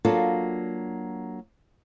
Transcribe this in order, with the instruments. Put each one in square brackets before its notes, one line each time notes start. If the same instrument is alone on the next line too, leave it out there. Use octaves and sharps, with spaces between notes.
[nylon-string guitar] F#3 A#3 D4 F4 F#4 A4